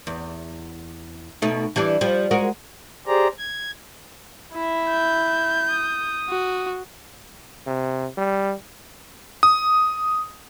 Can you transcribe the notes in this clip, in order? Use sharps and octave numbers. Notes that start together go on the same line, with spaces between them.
E2
B2 A3 D#4
E3 G3 D4
F3 G3
G#3 F#4 A#4
G4 G#4 C5 D5 A#5
G#6
E4 E5
G6
D#6
F#4
C3
G3
D#6